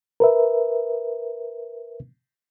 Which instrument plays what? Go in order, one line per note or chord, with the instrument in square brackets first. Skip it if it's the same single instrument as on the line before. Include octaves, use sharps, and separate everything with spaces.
[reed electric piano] A#4 B4 E5